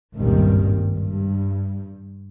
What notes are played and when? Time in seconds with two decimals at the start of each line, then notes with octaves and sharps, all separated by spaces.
0.16 G#1 C#2 G2 A#2 D#3 G3
0.98 G2